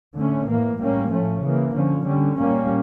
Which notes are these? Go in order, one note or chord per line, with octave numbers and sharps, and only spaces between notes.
D3 A3 C#4
A2 E3 A#3
A2 G3 A#3 C#4
A2 F3 A3 C#4
C#3 E3 A#3
D3 F3 C#4
D3 G3 C#4
A#2 G3 A#3 C#4